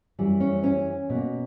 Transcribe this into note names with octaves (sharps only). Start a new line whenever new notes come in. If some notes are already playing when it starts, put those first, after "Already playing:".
F#2 E3 G3
C#4
C#4
B2
A#3